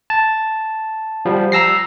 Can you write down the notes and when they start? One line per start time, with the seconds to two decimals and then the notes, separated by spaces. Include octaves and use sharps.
0.10 A5
1.25 F3 G3
1.52 A#5 E6 A#6 C7